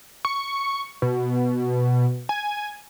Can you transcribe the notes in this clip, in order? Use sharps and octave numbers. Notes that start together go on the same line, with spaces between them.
C#6
B2
G#5